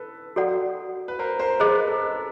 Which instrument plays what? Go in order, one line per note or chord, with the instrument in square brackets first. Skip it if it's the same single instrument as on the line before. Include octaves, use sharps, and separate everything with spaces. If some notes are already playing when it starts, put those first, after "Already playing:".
Already playing: [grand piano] A4 B4
[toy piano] F#4 A4 D5 F#5
[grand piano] B4
A#4 C5
A#4 C5
[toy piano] G#4 C5 D#5 [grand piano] B4
[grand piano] A#4
A4 B4